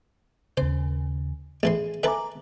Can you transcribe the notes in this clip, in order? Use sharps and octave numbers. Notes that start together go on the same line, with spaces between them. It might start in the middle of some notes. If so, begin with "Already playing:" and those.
D#2 C#3 C5
A1 E3 G#4 C6
A4 B4 E5 G#5 A#5 D6